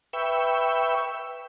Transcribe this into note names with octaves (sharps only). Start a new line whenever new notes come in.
B4 E5 G5 C#6 E6